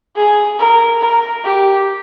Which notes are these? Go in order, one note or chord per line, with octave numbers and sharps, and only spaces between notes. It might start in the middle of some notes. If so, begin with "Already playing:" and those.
G#4
A#4
A#4
G4